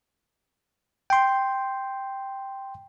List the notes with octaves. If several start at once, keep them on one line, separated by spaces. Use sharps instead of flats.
G5 C6